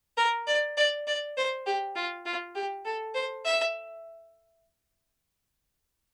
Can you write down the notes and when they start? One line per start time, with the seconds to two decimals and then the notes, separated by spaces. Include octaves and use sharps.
0.17 A#4
0.47 D5
0.77 D5
1.07 D5
1.37 C5
1.66 G4
1.96 F4
2.25 F4
2.55 G4
2.85 A4
3.14 C5
3.45 E5